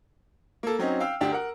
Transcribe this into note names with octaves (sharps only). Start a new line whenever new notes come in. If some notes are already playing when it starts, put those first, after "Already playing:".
A#3 A4
F#3 C4 C#4 D#4
F5 G5 E6
D2 D4 G4
A#4 F#5